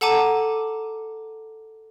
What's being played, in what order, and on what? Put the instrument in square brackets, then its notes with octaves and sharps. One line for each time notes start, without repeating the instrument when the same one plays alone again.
[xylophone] A4 F#5 A5 A#5 D6 D#7